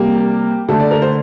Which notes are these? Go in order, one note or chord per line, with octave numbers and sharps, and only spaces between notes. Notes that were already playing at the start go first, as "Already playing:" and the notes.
Already playing: C3 G3 A#3 G4
D3 A3 A4
D5
A#4
C5